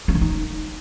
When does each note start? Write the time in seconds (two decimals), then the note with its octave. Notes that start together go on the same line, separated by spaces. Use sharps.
0.08 C#4
0.15 D#3
0.21 D#4